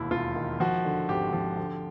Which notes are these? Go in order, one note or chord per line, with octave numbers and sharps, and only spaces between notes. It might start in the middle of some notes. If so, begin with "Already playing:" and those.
Already playing: E1 D#2 E4
E1 F4
D#3
F3 F#4
D3
G#1 G4
F3
D3